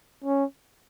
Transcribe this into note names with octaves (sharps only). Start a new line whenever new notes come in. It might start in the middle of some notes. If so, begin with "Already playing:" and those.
C#4